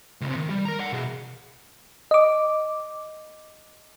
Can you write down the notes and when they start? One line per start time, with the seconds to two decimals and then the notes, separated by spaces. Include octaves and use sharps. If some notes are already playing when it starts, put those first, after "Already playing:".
0.21 C#2 C3
0.36 D#3
0.50 G3
0.65 A#4 A#5
0.79 D5 F#5
0.92 B2 G#4
2.11 D#5 D6